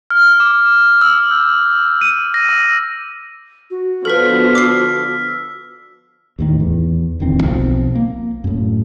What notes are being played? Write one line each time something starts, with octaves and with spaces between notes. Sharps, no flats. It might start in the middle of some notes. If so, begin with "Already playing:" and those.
F6
D6
E6
G6
D#7
A#6
E6
F#4
D3 F3 B3 A4 B4 F6 B6
D6 E6 B6 C7
D#2 A2 D#3
E2
D1 E2 D#3 C4
B1 F3 A3 C4
A#3
F#2 A2